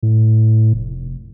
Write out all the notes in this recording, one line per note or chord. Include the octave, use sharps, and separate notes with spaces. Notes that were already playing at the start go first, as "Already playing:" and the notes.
A2
F1